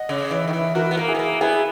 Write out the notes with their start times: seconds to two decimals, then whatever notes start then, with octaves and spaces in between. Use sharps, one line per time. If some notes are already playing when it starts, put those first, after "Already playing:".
Already playing: D#5 F#5
0.09 C#3
0.31 E3
0.47 D#3
0.53 E3
0.75 E3 F#4 A#4
0.91 B3
0.97 A#3 A#4
1.08 E4 G#4
1.15 B3
1.19 A#3
1.41 B3 E4 G#4